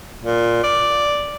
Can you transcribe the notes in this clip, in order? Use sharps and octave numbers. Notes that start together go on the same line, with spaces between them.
A#2
D5